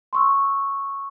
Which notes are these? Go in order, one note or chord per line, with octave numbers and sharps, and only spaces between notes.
C6 C#6 E6